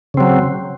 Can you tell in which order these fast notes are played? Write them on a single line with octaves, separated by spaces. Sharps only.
C#3 C4 F#3